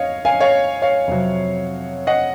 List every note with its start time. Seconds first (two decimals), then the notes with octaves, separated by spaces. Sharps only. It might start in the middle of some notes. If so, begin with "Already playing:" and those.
Already playing: F2 C#5 D#5 F5
0.25 F5 G#5
0.40 C#5 F5
0.82 C#5 F5
1.08 F2 C3 F#3
2.07 D#5 F#5